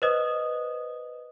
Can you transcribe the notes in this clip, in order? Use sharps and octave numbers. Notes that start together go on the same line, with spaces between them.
B4 C5 D#5 D#6